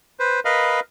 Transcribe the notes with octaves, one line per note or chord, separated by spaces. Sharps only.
B4 C5
A#4 B4 D#5 F5 B5